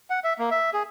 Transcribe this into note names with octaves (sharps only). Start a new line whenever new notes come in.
F#5
E5
A#3
E5
G#4